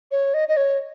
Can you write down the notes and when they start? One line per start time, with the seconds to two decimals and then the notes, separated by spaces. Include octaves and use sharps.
0.11 C#5
0.34 D#5
0.49 D#5
0.57 C#5